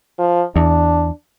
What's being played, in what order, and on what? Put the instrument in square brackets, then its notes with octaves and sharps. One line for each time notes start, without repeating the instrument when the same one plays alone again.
[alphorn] F3
[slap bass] E2 [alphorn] D4